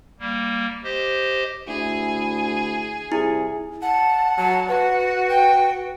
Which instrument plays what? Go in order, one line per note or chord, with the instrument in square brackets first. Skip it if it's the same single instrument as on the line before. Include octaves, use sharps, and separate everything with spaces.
[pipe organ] G3 A#3
G4 C5 D#5
[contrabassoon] D2 [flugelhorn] E4 [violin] G#4
[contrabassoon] C2 [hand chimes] E4 [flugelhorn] G#4
[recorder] F#5 [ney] A5
[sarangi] F#3 [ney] A5
[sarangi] F#4 [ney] B4
[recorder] G5